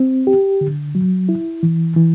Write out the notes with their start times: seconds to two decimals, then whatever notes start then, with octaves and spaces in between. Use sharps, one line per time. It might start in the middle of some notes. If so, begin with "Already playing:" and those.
Already playing: C4
0.27 G4
0.61 D3
0.95 F#3
1.29 E4
1.63 E3
1.96 E3